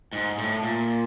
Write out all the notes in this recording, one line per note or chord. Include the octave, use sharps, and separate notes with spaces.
G#2
A2
A#2